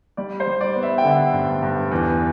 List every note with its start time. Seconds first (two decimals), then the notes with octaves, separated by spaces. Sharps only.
0.17 G3 D5
0.40 C5
0.47 G3
0.61 D5
0.75 B3
0.83 E5
0.98 G5
1.04 D3 F#5
1.33 G2
1.62 G2
1.91 E2